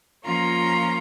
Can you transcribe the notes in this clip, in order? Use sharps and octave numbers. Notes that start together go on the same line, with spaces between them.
F3 A#3 C#4 F4 A#5